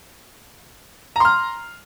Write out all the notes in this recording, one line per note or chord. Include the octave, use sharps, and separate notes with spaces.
A#5 C6 F6